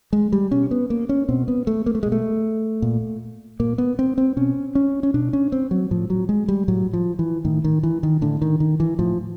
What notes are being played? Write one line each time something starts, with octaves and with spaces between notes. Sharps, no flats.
G#3
G3
B2 C#4
B3
A#3
C#4
B2 C4
B3
A3
A#3
A3
B2 G#3
A3
A#2
A#2 A#3
B3
C4
C4
B2 C#4
C#4
C#4
B2 D4
C#4
C4
F#3
A2 F3
F#3
G#3
G3
A2 F#3
F3
E3
A2 D#3
D#3
E3
D#3
A2 D3
D#3
D#3
E3
A2 F3